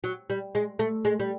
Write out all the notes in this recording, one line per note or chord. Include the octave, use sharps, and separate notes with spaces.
F#3
G3
G#3
A3
G#3
G3